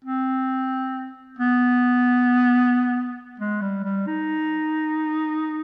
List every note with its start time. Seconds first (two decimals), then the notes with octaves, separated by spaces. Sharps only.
0.04 C4
1.39 B3
3.40 G#3
3.62 G3
3.84 G3
4.07 D#4